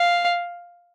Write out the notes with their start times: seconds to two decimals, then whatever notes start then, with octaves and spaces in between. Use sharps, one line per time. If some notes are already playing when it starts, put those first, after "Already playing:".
Already playing: F5